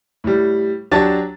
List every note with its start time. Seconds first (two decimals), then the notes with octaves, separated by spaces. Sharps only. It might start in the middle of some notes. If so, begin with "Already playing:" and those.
0.24 A2 G3
0.91 F#3 D4 G4 C#5 A5 A6